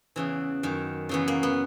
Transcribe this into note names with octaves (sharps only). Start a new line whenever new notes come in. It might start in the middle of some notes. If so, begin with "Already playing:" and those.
E2 C#3 E3
F#2 D#3
F#2 C#3 E3 B3
A#3
B3